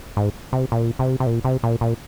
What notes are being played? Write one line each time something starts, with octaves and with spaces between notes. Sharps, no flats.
G#2
C3
A#2
C3
C3
A#2
C3
A#2
A#2